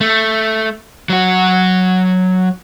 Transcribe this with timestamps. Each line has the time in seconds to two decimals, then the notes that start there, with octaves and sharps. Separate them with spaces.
0.01 A3
1.09 F#3 F#4